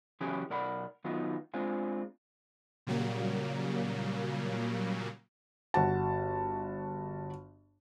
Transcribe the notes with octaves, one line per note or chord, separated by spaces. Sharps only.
C#3 E3 F#3 C#4 G4 G#4
B1 A#4 D5 F#5 B5
D#3 F#3 B3 D#4 F4
G#3 C4 D4 F4 G#4
A#2 C#3 F#3 G3 A#3
G1 F#4 A5